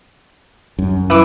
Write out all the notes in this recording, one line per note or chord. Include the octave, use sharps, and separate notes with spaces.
F#2
E3 D6